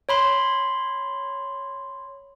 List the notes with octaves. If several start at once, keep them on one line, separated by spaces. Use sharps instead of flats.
C#5 B5 C6